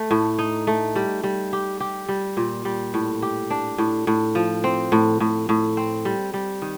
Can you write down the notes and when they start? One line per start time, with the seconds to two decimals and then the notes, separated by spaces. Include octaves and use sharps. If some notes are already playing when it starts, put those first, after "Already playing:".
Already playing: A3
0.11 A2
0.39 D#4
0.67 A3
0.96 G3
1.24 G3
1.53 G4
1.80 G4
2.09 G3
2.37 A#2
2.65 G3
2.94 A2
3.22 G4
3.50 D4
3.78 A2
4.07 A2
4.35 F3
4.64 C4
4.92 A2
5.20 A2
5.49 A2
5.77 C4
6.05 G3
6.34 G3
6.62 D#3